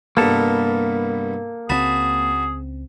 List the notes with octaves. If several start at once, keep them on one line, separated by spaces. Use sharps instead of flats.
C2 G2 A#3 B3 A4
C#2 F#3 C4 F#4 G#4 A5 B5